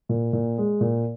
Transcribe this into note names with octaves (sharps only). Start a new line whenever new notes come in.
A#2
A#2
G#3
A#2